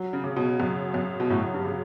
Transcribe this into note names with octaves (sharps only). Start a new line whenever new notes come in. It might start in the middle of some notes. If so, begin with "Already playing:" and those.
Already playing: F#3
C#3
C#3
B2
F#2
F#2
B2
A2 F#3
G2
C#3